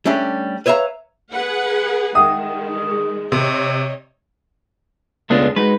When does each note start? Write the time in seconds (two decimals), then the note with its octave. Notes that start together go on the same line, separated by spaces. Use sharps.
0.05 G3 A3 C#4 D4 G4
0.66 B4 C#5 E5 F5 A#5
1.32 G#4 B4 F#5
2.15 D#3 G#3 E5 F#5 G5 D#6
2.91 G#4
3.32 C3 C#5 D#5 C6
5.30 C#2 G#3 A3 B3 D4 F4
5.56 G#3 D#4 F#4 B4